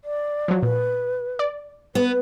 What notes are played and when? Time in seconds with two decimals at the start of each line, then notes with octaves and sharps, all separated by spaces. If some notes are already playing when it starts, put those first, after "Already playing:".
0.04 D5
0.48 F3 F#3
0.63 A#2 B4
1.39 D5
1.95 B3 B4